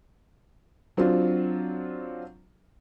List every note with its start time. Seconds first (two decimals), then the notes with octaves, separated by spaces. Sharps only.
0.97 F#3 C4 D4 F4